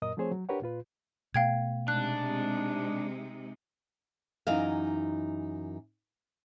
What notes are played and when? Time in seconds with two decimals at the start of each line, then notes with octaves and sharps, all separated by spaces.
0.02 F#2 A#2 A#4 D#5 D#6
0.17 F3 A3 C4 G#4 C5 C#5
0.31 F#3
0.49 D4 G4 A#4 B4 C#5 F#5
0.62 A#2 F4 B4
1.34 B2 A3 F5 G5 G#6
1.88 C3 G#3 D4 D#4 F#6
4.47 F#2 E3 D#4 D#5 F5